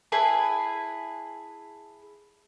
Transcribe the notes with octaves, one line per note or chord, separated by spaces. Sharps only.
E4 G#4 B4 A5